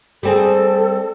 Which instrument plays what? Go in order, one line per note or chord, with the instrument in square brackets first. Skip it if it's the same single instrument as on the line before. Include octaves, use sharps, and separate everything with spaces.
[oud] G3 C4 G#4 [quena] A4